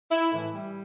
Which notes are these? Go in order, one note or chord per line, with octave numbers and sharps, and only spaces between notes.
E4
A2 E3
G3